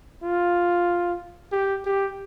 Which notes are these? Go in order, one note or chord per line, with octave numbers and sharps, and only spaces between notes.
F4
G4
G4